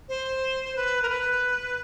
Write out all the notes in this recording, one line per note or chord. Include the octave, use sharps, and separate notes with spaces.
C5
B4
A#4
B4